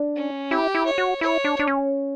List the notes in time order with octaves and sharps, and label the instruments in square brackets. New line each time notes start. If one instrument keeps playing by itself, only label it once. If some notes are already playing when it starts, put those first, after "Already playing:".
Already playing: [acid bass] D4
[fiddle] C#4
[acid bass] E4 [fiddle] G4
[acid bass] E4
[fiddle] C#5
[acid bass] F#4
[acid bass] E4 [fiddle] C#5
[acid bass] D4
D4
C#4